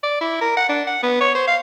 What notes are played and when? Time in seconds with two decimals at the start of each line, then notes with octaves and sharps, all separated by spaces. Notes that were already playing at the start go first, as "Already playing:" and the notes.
0.03 D5
0.21 E4
0.41 A#4
0.57 F#5
0.69 D4
0.87 F#5
1.03 B3
1.21 C#5
1.35 C5
1.48 F5